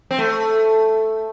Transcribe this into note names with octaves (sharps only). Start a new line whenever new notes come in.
C4
A3